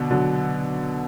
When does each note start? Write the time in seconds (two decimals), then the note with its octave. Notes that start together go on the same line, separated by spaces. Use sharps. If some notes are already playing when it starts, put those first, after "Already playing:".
Already playing: B2 D3
0.11 D3 F#3